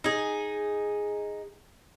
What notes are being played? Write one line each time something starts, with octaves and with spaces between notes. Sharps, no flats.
D#4 G#4